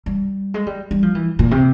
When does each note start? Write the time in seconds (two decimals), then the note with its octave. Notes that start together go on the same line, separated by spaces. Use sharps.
0.06 G3
0.54 G#3
0.67 G3
0.91 G3
1.03 F3
1.15 E3
1.39 A#2
1.51 C3